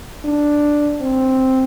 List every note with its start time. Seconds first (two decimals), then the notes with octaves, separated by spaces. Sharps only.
0.25 D4
1.01 C4